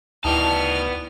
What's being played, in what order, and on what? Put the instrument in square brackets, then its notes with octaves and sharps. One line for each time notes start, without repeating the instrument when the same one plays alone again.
[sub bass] D2 [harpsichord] D#3 E3 G3 [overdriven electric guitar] B3 A5 [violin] F6